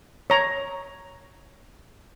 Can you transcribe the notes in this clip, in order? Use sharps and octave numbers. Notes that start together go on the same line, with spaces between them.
C#5 A#5